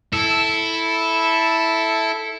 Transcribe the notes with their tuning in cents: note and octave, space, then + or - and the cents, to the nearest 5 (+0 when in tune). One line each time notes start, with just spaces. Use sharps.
E4 -5 A4 +0